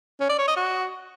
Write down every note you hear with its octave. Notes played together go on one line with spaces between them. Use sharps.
C#4
D5
C#5
D#5
F#4